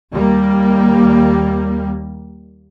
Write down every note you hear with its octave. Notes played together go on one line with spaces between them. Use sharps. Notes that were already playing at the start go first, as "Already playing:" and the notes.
D#2 G3 A#3